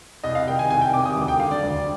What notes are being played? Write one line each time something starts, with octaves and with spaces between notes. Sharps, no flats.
C2 D#5
F5
C3 D#3 G5
G#5
C2 G#5
G5
C3 D#3 D6
D#6
D2 D6
G5
D3 F5
D5
D2